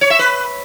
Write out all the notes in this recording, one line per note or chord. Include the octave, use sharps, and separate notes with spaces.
C#5
E5
B4